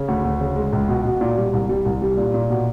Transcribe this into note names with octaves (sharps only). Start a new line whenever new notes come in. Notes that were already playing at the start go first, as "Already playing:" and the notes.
Already playing: C#3
D2
D2
C#3
G#3
C#2
B2
B2
A#2
G3
C2
G3
C2
G3
A#2
A#2
B2